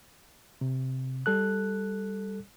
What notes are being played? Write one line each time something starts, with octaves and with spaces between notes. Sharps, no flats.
C3
G3 A4 F#6